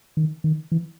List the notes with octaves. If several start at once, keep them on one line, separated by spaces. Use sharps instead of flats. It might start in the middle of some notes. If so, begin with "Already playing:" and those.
D#3
D#3
E3